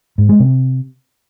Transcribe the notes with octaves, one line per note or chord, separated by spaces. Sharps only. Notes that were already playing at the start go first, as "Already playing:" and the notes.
G#2
G#3
C3